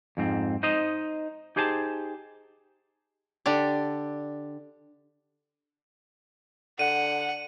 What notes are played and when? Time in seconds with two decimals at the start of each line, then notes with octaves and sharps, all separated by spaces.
0.17 F2 G#2 C4
0.63 D#4 C5 D#5
1.56 D#4 G4 G#4 C5 G#5 A5
3.46 D3 D4 G4
6.79 D3 F#5 D#7